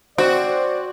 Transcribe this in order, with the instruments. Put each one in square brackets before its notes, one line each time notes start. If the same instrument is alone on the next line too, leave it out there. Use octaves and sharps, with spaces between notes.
[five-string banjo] C4 [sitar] F#4 [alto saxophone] C5 [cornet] D5